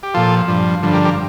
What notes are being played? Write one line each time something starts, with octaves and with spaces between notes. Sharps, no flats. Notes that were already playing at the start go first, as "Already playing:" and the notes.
G4
A#2 F3 F4 A4
G2 F3
G2 D3 F3
G4 A#4
G4 A#4